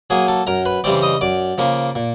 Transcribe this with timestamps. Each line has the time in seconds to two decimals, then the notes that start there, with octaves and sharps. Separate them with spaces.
0.10 F#3 A#3 G#4 G#5
0.28 A4 A5
0.47 F#2 A#4 A#5
0.66 B4 B5
0.84 C#3 E3 G3 C4 D5 D6
1.02 D#5 D#6
1.21 F#2 D5 D6
1.58 C#3 F3 A#3
1.95 A#2